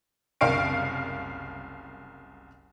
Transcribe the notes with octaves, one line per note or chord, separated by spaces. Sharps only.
F#1 C2 A#4 F5 C#6 D7